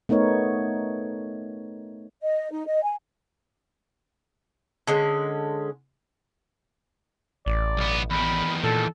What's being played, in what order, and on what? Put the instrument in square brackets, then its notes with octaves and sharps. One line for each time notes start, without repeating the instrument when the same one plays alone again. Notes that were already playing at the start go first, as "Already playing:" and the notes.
[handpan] A3 B3 D#4 A#4 C#5
[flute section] D#5
D#4
D#5
G#5
[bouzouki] D3 G#3 C#4
[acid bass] A1 [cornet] D5
[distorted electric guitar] B1 B3
[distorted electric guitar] E2 D#3 [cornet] B5
[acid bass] A#2 [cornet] A4